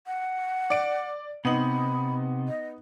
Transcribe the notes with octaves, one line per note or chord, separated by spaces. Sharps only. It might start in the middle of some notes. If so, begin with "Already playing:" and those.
F#5
D5 D7
C3 B3 D#4 B5 F#7
D#5